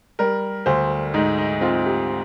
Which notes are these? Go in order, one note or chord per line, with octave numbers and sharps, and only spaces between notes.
G3 A#4
D2 C5
G#2 D#4
D#4
C4 F4
G4